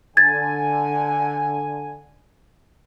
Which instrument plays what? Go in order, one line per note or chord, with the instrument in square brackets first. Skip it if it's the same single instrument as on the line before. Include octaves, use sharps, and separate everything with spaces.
[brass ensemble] D3 G#5 [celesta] G#6 A6